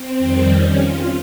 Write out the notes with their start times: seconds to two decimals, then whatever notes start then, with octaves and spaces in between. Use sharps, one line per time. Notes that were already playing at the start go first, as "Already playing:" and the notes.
Already playing: C4
0.18 F2 D#3 G3
0.47 C#4
0.78 F4